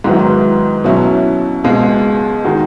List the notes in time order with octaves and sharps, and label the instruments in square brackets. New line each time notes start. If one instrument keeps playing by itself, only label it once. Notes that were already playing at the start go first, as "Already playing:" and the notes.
[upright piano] G#2 D#3 F#3 B3 E4
B2 F#3 C#4 E4
C#2 B2 G#3
D#3 G#3 D#4 F#4